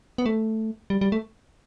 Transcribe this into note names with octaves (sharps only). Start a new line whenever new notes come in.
B3
A3
G3
G3
A3